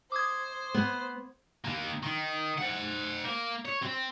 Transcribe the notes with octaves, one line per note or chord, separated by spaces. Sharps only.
C5 D6 D#6 G#6
B3
D#3 A#3
D#3
C5 F#5
A#3
C#5
C4